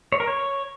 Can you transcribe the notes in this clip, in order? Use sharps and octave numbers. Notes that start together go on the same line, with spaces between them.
C#5
A#4
C#5